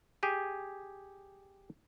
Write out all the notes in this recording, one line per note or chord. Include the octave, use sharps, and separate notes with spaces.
G4 G#4 G#5